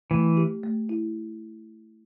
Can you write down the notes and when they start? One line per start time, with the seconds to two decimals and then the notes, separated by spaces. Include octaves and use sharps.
0.11 E3 A3
0.37 G4
0.63 A3
0.89 E4